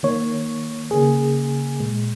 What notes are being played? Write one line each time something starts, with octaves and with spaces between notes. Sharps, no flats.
D#3 A#3 C#5
C#3 A#3 G#4
A#2 G#3